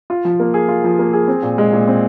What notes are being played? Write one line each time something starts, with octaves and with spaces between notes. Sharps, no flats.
F4
F3
A#3
G#4
F4
F3
A#3
G#4
C4
A#2
G#3
A#2
C4